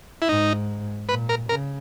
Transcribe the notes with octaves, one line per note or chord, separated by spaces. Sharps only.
E4
G#2 D#4
A#2 B4
A#4
C#3 A#4